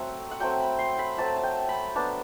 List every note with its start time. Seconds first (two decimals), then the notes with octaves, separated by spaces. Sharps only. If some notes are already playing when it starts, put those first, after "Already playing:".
Already playing: F#3 A3 C4 E5 F#5
0.31 F#5
0.40 F#3 A3 C4 G5
0.60 B5
0.79 C6
0.99 B5
1.18 F#3 A3 C4 A5
1.36 A5
1.43 G5
1.69 B5
1.96 F#3 B3 D4 A5